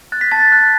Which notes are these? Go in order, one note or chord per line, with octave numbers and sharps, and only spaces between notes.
F#6 A6
B6
A5 A6
F#6